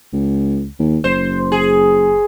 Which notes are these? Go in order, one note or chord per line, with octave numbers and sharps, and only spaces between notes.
C#2
D#2
F#1 C5
G#4